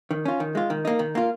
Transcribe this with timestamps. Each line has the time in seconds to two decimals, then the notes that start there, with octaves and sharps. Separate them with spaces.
0.11 D#3
0.25 C#4 F4
0.40 D#3
0.55 G#3 F4
0.70 D#3
0.85 A#3 D#4
0.99 D#3
1.15 A#3 F4